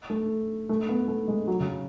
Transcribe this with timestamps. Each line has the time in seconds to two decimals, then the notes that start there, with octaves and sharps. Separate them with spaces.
0.10 A3
0.69 A3
0.89 B3
1.08 A3
1.28 G#3
1.47 F#3
1.60 C#3